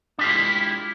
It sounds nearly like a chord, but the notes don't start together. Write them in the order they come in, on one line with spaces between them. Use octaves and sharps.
D4 G4 F4 G#3 E4